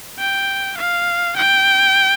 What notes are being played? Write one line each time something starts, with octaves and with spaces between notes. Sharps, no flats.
G5
F5
G5